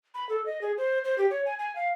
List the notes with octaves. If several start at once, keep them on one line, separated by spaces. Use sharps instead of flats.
B5
A4
D#5
G#4
C5
C5
G4
C#5
G#5
G#5
F5